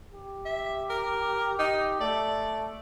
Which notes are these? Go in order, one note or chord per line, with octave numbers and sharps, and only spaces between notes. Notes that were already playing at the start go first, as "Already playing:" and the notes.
G4
E5
A#4
D#4 G4
A3 D5